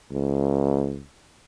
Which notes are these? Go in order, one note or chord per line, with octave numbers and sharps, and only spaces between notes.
C#2